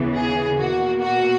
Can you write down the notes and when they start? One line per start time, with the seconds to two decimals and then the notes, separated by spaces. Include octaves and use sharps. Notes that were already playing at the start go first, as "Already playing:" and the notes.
Already playing: D#2 C#3 E3 B3
0.15 G#4
0.58 B2 A#3 F#4
1.00 F#4